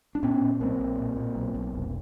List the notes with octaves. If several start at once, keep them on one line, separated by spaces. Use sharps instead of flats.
D4
A#2 B3 C#4
A#2
B1 A#3 C4
B1
A#2
A#2
B1
B1
F1